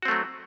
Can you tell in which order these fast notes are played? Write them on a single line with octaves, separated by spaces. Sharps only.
F#4 C4 A3 F#3